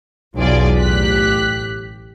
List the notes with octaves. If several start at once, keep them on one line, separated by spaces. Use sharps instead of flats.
B1 E2 F#3 F4 G#4 D5
A1 G4 F#6 B6